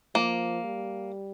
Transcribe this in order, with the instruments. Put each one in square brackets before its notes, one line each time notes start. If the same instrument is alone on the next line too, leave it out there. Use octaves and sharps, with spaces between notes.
[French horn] F3 [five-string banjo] A#3
[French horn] G3